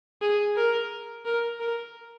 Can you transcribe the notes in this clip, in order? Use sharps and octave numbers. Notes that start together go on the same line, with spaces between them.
G#4
A#4
A#4
A#4